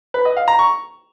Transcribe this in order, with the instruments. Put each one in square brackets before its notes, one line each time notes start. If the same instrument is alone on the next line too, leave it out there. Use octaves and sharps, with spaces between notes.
[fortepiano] B4
D#5
F5
A#5
C#6